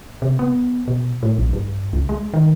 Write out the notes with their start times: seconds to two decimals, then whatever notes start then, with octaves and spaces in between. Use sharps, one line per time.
0.22 C3
0.39 B3
0.88 B2
1.23 A2
1.38 A#1
1.53 G2
1.93 C#2
2.09 G#3
2.34 D#3